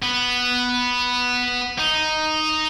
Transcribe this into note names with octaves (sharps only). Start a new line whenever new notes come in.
B3
D#4